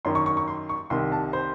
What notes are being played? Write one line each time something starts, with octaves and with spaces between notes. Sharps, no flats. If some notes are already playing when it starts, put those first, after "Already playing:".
F#2 D#3 C6
C#6
C#6
C#6
C6
C#6
C2 C3 D#3 C6
A5
C5